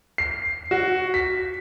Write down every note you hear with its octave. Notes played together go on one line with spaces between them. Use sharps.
C7
F#4
B6